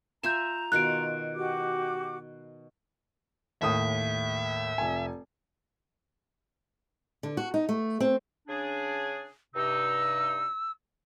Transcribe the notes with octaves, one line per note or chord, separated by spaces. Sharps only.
F4 E5 G#5 A#5 G6 E7
B2 D#3 F4 F#6 D7
F#4 G4 D6
D#2 A2 E5 D#6
F1 G#5
D3
F#4
D#4
A3
C4
C#3 D4 G#4
G2 C3 D#4 E6